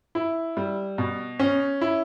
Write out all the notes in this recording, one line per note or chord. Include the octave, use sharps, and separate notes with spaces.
E4
G3
B2
C#4
E4